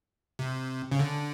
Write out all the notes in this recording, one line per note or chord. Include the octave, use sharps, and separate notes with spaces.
C3
C#3
D3